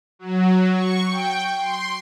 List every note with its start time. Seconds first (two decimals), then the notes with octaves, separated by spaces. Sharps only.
0.19 F#3
0.72 C#6
1.08 G5
1.58 C6